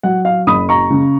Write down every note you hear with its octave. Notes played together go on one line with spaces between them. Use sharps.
F#3 F#5
F5
F#1 B5 D#6
A#5 C#6
C#3